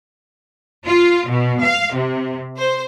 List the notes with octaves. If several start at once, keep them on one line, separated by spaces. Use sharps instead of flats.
F4
B2
F5
C3
C5